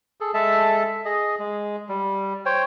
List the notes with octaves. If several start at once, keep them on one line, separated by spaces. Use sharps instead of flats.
G#4 A4
G#3 A4 E5 A5
G#4 D#5
G#3
G3
C5 C#5 G5